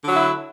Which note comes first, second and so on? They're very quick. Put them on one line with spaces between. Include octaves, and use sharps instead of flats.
D3 F#3 F#4 E4